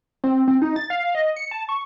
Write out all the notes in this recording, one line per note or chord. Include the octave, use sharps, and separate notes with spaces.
C4
C4
D#4
A6
F5
D#5
C#7
A5
C#6